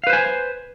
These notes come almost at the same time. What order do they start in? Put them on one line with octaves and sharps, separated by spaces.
F5 B4 C5 G#5